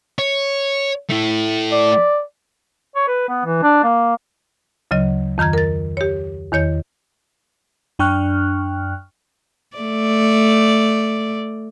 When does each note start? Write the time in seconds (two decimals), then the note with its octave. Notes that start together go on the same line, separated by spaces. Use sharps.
0.19 C#5
1.10 A3 E4
1.72 D5
2.96 C#5
3.08 B4
3.29 B3
3.45 E3
3.63 D4
3.84 A#3
4.91 D2 C#3 F#3 D#5
5.38 F2 D#3 A#5 F6 G#6
5.53 A#4 A6
5.97 G4 C#5
6.52 E2 D#3 C#5 G6
7.99 F#2 D4 G5 C#6 F6 F#6
9.77 A3 D5